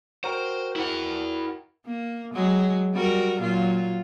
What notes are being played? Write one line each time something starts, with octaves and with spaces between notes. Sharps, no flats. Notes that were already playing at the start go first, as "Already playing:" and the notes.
F#4 A#4 C5 G5
E4 F#5
A#3
F#3 G#3
G3 F#4 A#4
A#2 F#3 F4